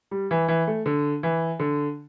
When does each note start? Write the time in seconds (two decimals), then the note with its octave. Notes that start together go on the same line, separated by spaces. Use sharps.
0.11 G3
0.31 E3
0.48 E3
0.67 A3
0.86 D3
1.23 E3
1.60 D3